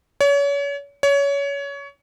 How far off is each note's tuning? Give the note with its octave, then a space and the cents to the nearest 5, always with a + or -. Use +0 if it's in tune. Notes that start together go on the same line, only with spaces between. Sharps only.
C#5 +35
C#5 +25